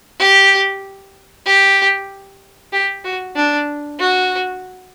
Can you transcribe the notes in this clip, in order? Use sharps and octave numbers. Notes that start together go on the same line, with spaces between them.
G4
G4
G4
F#4
D4
F#4